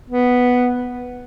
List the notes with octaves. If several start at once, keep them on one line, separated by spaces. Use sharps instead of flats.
B3